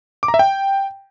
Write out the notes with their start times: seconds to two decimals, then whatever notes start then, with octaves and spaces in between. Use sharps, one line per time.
0.23 D6
0.28 A#5
0.34 E5
0.39 G5